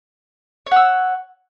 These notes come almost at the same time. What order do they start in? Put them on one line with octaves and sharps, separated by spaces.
C#5 F#5 E6